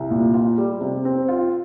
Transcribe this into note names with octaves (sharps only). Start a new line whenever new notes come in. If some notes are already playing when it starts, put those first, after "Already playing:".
Already playing: C2
A#2
F4
G3
C3
C4
F4